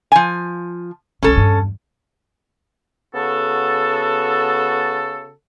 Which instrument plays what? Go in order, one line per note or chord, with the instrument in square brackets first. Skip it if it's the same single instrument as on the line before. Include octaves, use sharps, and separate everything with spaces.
[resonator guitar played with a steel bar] F3 G#5
[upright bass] C2 C3 [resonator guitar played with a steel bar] C#4 A4
[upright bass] E2 G2
[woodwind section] C#3 B3 F#4 A4